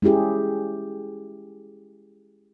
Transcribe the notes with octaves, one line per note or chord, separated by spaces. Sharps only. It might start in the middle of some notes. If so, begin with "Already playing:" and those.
G#3 C#4 E4 G4 G#4